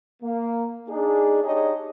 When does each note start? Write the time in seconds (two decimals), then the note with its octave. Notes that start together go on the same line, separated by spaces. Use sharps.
0.22 A#3
0.88 D4 D#4 G#4
1.43 D4 D#4 G4 G#4 C#5 D#5